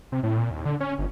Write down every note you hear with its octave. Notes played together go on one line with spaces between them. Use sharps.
C3
A2
A#2
D#2
D3
C#4
G1